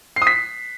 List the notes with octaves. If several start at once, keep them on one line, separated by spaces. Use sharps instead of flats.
C7
D#6
B6